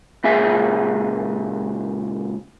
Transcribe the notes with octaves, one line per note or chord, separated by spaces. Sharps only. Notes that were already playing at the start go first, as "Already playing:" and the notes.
C#2 A#2 G#4 E5